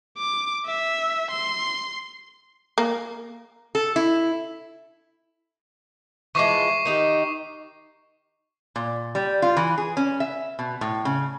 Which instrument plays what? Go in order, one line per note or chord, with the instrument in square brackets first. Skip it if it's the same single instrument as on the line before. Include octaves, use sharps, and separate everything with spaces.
[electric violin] D6
E5
C6
[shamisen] A#3
[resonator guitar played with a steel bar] A4
E4
[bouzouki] E3 F3 G#3 [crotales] C#6 D6 C7
[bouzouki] D#3 D#4 G4
[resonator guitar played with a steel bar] A#2
G3
F4
E3
G#4
C#4
E5
B2
A2
C#3